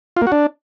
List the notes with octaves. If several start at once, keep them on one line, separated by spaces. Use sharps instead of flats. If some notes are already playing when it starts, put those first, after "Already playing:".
F4
A#3
F#4
D4